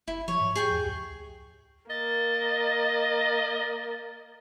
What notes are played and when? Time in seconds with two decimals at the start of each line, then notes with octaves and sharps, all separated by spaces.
0.08 F#1 E4
0.28 F3 C#5
0.41 G#2
0.55 G#4 G5 C#6
0.71 E2
0.86 C#2
1.90 A#3 D#5 A6